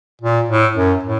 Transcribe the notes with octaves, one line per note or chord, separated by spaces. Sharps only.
A#2
A2
F#2
A2